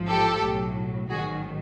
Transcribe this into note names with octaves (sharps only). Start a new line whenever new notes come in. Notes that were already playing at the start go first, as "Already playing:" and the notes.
Already playing: A1 G#2 F3
G4 A4
B1 A2 F#3
A1 G#2 D#3 F#3 F#4 G#4